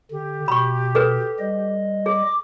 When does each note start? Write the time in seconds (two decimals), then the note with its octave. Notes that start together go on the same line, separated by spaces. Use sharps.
0.11 D3 G4
0.48 B2 B5 C#6
0.95 G#4 A4 B4
1.39 G3 D#5
2.06 G#4 D6